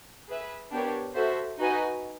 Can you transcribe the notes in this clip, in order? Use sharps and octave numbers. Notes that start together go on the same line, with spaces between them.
G#4 B4 E5
B3 D4 G4 A#4 C#5
F#4 A4 C5 E5
D#4 F#4 B4 D#5 G#5